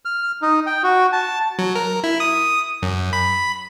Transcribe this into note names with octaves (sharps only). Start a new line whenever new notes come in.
F6
D#4
G5
F#4
A5
F#3
A#4
E4
D#6
F#2
B5